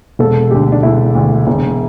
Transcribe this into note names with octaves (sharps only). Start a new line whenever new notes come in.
E1 A4
D2 D3 G4
D4
E1 E4
D2 D3
E1